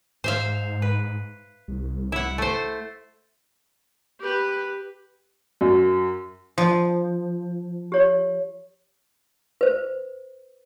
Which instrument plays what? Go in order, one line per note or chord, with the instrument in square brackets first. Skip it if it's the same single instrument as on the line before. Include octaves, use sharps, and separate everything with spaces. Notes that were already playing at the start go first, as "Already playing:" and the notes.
[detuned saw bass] G#2 [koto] C5 E5 F5
[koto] B4
[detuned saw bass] C2
[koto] E4 F#5
A3 C5
[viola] G4 B4
[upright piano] F#2
[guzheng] F3
[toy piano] G4 C#5
B4 C5